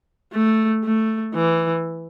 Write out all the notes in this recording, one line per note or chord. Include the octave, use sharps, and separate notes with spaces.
A3
A3
E3